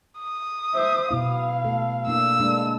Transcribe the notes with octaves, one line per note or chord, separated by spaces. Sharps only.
D#6
C5 E5
B2 B3 E4 F5
A3 A4
A#3 D4 E4 E6
G#3 A#3 D4